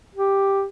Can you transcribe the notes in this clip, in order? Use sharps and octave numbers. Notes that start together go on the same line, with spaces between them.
G4